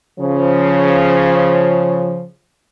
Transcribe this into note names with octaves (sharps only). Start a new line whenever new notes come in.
C#3 F3